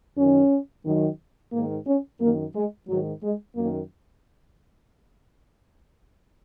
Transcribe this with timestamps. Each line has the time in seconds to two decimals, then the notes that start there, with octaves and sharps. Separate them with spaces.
0.17 F#2 D#3 C#4
0.85 F#2 D#3
1.53 G#2 D#3 A#3
1.87 C#4
2.21 F#2 D#3 A#3
2.55 G#3
2.88 G#2 D#3 F#3
3.22 G#3
3.56 F#2 D#3 A#3